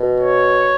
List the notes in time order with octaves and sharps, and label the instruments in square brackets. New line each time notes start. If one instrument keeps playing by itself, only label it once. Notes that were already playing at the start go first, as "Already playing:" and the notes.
Already playing: [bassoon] B2
[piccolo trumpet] C#5